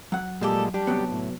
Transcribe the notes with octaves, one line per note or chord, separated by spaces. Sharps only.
F#3 F#5
A#2 G3 G#3 G4 A4 G6
G3 D4 G4
C3 F#3 B3
A2